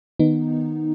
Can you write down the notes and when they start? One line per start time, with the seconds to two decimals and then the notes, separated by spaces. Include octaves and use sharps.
0.20 D#3 B3 D#4